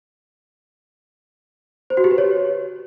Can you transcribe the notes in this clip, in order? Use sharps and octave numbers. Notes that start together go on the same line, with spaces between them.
C5
F#4
G4
B4
C#5